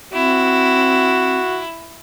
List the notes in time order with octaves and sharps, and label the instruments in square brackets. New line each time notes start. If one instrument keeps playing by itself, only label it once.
[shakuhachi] C4 [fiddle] E4 [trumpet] F#4